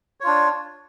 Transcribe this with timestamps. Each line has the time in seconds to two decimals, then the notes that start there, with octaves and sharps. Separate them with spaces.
0.20 C#5
0.24 F4
0.27 D4